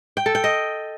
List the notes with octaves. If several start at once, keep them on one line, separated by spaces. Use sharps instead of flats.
G5
A4
G5
D#5